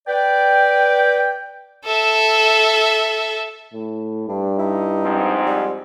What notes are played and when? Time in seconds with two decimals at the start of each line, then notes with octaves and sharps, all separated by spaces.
0.08 B4 D5 G5
1.84 A4 E5
3.74 A2
4.29 G2 D4
4.59 D#4 E4
5.02 F2 G#2 C4
5.46 G3